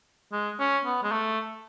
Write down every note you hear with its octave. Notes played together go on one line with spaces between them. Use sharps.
G#3
C#4
B3
G#3
A3